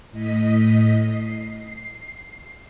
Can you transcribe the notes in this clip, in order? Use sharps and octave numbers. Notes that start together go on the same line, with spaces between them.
A2 D#5 B6
C7